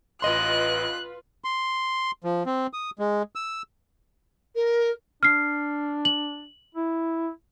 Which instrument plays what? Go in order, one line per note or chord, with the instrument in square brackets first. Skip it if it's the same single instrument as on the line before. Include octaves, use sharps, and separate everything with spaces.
[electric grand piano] A1 D#5 C6 [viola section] F4 B4 [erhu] F#6
[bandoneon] C6
F3
C4
D#6
G#3
E6
[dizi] A#4
[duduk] D4 [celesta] F6 C7
[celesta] F#7
[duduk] E4